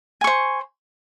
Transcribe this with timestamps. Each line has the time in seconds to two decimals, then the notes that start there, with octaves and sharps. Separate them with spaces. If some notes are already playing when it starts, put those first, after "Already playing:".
0.21 G#5
0.24 C#6
0.27 C5